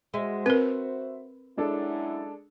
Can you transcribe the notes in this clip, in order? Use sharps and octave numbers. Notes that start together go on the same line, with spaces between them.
G#3 F#4 C5 E5
C4 A#4 B4
F#2 G#3 D4 E4 A4